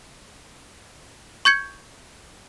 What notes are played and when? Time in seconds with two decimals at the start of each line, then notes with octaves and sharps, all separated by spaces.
1.45 C#6 G6 G#6 C#7